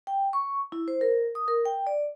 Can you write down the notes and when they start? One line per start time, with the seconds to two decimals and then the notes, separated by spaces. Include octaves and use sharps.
0.07 G5
0.33 C#6
0.72 E4
0.88 C5
1.01 A#4
1.35 D#6
1.48 A#4
1.65 G5
1.87 D5